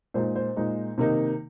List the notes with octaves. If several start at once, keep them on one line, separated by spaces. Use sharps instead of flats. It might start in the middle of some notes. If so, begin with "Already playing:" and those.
A#2 G#3 D#4 C5
C5
A#2 G#3 D#4
C3 D#3 A#3 D#4